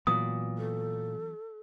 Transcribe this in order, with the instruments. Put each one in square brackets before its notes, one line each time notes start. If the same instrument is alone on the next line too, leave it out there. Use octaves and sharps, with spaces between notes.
[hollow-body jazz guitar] A#2 [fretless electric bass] E3 F#3 B3 [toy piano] D#6
[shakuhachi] A4